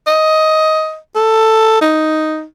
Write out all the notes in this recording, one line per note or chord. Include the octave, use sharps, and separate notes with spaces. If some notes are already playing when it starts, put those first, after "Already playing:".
D#5
A4
D#4